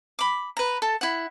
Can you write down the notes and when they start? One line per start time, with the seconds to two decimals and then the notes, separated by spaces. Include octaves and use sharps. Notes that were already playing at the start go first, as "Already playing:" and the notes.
0.19 B5 D6
0.57 B4 A#5
0.82 A4 A5
1.01 E4 F#5